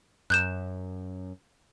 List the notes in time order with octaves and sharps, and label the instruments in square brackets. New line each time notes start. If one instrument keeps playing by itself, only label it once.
[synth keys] F#2 [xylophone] F#6 G6 E7